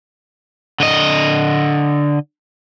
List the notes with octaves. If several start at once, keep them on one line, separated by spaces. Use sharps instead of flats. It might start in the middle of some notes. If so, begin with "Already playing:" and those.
D3 D#5